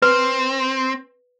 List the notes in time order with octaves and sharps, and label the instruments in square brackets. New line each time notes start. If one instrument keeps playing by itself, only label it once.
[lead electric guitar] C4 [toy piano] B4